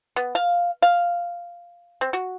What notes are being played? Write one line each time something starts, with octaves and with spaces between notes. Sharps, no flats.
B3
F5
F5
C4
F#4